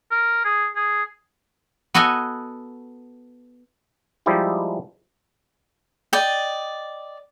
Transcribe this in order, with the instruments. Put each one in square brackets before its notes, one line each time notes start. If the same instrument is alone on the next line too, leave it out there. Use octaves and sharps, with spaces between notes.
[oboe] A#4
G#4
G#4
[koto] B3 F#4 A4 D#5 G#5
[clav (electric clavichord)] F3 G3 G#3 D#4 E4 G4
[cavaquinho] D5 D#5 G5